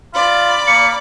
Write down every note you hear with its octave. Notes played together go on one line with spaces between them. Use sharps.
F4 D5 B5
A#3 C#7